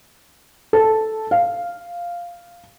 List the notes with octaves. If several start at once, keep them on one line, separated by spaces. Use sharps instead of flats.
A4
F5